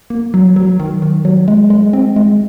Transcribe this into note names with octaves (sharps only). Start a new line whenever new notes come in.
A#3
F#3
F#3
D#3
D#3
F#3
G#3
G#3
C4
G#3